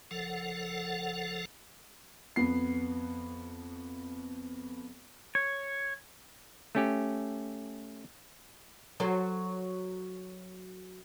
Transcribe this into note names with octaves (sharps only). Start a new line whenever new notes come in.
F#1 F3 A4 F#5
F2 B3 C7
C#5
A3 C#4 G4
F#3 A4 C5